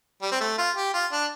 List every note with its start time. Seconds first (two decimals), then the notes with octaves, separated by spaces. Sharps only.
0.22 G3
0.31 C4
0.40 A3
0.58 F4
0.76 G4
0.94 F4
1.12 D4